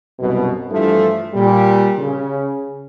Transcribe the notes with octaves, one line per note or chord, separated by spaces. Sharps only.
C2 F#2 B2
G2 E3 F3 A3
A#2 G3
C#3